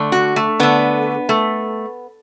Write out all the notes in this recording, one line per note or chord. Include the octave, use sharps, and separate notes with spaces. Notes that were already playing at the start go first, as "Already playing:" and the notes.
Already playing: D3 A3
F#4
A3
D3 A3 B3
A3